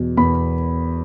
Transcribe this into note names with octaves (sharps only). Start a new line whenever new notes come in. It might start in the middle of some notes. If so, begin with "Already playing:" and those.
Already playing: E2 B2
E2 B5